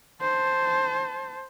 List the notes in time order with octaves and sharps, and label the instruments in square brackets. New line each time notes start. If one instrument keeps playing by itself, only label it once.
[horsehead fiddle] C5 A5